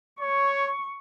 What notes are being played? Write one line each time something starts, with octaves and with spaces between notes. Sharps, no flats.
C#5 C#6